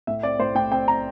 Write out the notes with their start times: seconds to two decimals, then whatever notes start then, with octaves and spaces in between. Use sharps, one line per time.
0.07 A2 E5
0.23 C4 D5
0.39 A2 C5
0.55 A2 G5
0.71 C4 G5
0.88 C4 A#5